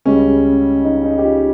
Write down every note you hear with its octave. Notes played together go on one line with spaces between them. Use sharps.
C#2 C#3 G3 C#4
D#4
D#4
G4
F4